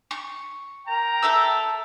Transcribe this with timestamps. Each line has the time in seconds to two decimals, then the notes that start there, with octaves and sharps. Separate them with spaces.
0.11 C#6
0.87 A#4 G5 A#5
1.23 A4 E5 E6